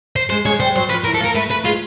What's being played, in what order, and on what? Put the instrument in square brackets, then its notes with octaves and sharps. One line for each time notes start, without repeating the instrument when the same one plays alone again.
[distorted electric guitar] C5
[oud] G#3 [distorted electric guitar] C5
[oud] G#3 [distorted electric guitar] C#5
[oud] G3 [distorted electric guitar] C5
[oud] F#3 [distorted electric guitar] C5
[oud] F3 [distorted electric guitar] B4
[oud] E3 [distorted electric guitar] A#4
[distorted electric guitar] A4
[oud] A#3
[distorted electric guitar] A#4
[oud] A3 [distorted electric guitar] B4
[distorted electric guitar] B4
[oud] G#3 [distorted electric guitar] F4